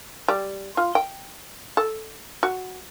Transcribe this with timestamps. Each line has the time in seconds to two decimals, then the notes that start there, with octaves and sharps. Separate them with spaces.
0.28 G3
0.77 F4
0.95 G5
1.77 A4
2.43 F#4